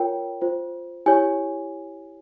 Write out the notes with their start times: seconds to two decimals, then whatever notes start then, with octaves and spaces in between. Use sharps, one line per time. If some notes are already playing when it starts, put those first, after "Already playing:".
Already playing: F4 A#4 C#5 G5
0.41 F4 C5
1.06 E4 G4 C#5 G#5